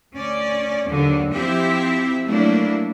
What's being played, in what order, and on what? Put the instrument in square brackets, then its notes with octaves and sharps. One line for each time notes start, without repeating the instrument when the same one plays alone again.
[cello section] D2 C#4 D5
D#2 D3 F#3
F3 C4 E4 G4 E5
F#3 A3 A#3 D4 E4